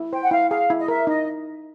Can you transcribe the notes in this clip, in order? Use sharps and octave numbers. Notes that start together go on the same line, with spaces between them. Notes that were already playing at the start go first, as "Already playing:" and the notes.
Already playing: E4
C5 G5
F#5
E4 F5
G#4 F5
E4
D#5
A#4 E5
D#4 D#5